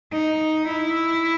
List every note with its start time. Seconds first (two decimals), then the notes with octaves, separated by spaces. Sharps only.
0.12 D#4
0.67 E4